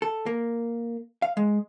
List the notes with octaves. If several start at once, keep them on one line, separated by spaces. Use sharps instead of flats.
A4
A#3
F5
G#3